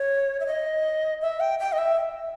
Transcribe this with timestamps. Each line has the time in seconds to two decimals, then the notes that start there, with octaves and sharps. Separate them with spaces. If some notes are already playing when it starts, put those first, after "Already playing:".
Already playing: C#5
0.40 E5
0.46 D#5
1.21 E5
1.40 G5
1.59 G5
1.72 D#5
1.78 E5